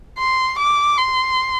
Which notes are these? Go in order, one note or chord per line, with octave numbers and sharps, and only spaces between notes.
C6
D6
C6